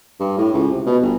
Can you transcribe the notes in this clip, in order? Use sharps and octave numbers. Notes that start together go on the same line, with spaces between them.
G2
A2
C#2
C3
B2
G1